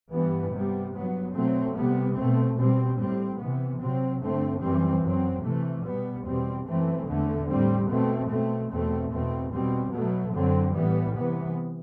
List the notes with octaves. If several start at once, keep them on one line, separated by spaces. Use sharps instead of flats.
G2 E3 G3 B3
C3 G3 B3
G2 F#3 B3
B2 F#3 A3 C4
C3 G3 B3
B2 A3 C4
B2 G3 C4
A2 G3 C4
C3 E3 B3
C3 F#3 C4
G2 D3 A3 C4
F#2 E3 G3 C4
F#2 F#3 C4
C3 E3 A3
B2 G3 B3
E2 B2 G3 C4
F#2 E3 A3 C4
E2 D3 A3
A2 G3 C4
B2 A3 C4
B2 A3 C4
E2 B2 A3 C4
E2 B2 A3 C4
B2 G3 C4
B2 F#3 A3
F#2 D3 F#3 C4
A2 E3 G3 B3
C3 E3 B3